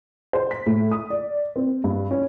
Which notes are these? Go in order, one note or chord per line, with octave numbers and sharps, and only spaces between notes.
C5
B6
A2
D#6
D5
C4
G2
C#4